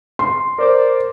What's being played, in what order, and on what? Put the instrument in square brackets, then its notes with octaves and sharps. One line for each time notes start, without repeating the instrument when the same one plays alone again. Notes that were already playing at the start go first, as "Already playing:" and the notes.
[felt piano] C6
[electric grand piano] A#4 C5 D6 [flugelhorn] D5